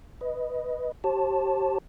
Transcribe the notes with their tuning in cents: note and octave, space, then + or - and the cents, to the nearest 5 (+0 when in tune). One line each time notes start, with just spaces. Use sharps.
B4 +0 D#5 +5
G4 -25 C5 +45 A5 +0